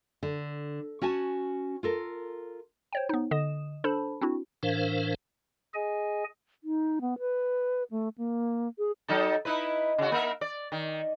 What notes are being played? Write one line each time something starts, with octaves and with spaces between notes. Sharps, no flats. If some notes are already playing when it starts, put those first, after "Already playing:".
D3
C#4 F#4 G#5 A5
F4 A4 A#4
C5 C#5 G5
B3 D#4
D3 D#5 D#6 E7
D4 A4 C5 A5 B5
C4 D4 E4 F#4
A2 E3 D4 A#4 C5 F5
G#4 D#5 G#5
D#4
B3
B4
A3
A#3
G#4
F#3 D#4 A4
D#4 E4 B4
C#3 F#4
A#3 A#4 E5
D5
D#3